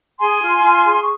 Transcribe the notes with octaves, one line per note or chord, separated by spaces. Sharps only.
G#4 G#5 C6
F4
F4
G#4
C#6